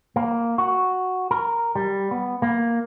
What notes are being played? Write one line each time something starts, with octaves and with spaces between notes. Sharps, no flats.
A#3
F#4
A#4
G3
B3
A#3